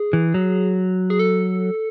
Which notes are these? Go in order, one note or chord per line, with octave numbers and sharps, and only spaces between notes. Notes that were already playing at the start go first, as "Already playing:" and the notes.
Already playing: G#4
E3
F#3
G#4
A4